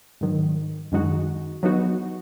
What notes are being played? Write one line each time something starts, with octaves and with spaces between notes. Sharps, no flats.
G#2 D#3 F#3
F#2 D#3 G#3 D#4 F#4
F#3 B3 D#4 F#4